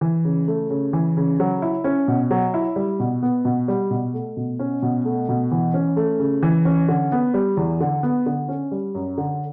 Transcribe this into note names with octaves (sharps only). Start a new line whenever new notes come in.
E3
C#3
A3
C#3
E3
C#3
F#3
E4
C#4
B2
F#3
E4
G3
B2
B3
B2
G3
B2
A3
B2
C#4
B2
A3
B2
E3
C#4
A3
C#3
E3
C#4
D3
B3
G3
E2
D3
B3
D3
C#4
G3
F#2
D3